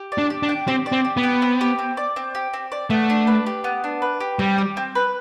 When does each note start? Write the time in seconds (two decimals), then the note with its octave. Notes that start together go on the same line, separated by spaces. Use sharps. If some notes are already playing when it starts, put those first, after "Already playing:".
Already playing: G4
0.12 D5
0.18 D4
0.30 G4
0.43 D4
0.49 G5
0.68 C4 G4
0.86 D5
0.92 C4
1.05 G4
1.17 B3
1.23 G5
1.42 C4
1.61 G4
1.79 C4
1.97 D5
2.16 C4
2.35 G4
2.54 C4
2.72 D5
2.90 A3 B3
3.10 D4
3.27 B4
3.46 G4
3.64 B3
3.84 D4
4.02 B4
4.20 G4
4.39 G3 C4
4.58 G4
4.77 C4
4.95 B4